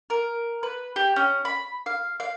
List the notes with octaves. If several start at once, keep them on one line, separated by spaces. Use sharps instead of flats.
A#4
B4
G4
C#4
B5
F5
F5